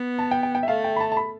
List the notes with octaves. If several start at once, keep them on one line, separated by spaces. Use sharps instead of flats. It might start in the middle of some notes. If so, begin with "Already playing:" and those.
Already playing: B3
A5
G5
G5
G5
E5
A3 F5
G5
B5
A5
A5
B5